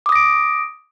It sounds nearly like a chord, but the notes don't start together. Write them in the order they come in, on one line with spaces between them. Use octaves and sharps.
D6 D#6 A#6 D7